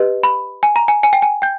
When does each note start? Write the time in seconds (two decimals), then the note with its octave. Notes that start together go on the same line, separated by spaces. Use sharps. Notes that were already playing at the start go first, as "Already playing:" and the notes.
Already playing: G4 B4 D#5
0.23 B5
0.63 G#5
0.76 A#5
0.88 G#5
1.03 G#5
1.13 G5
1.22 G#5
1.42 G5 G6